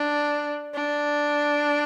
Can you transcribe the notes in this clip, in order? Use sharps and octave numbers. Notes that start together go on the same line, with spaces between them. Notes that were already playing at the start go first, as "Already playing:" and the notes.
Already playing: D4
D4